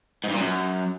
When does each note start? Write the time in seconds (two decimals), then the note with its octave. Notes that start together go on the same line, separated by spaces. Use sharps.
0.24 G#2
0.29 G2
0.34 A#2
0.40 F#2